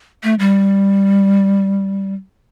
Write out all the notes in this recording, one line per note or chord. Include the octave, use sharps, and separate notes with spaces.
A3
G3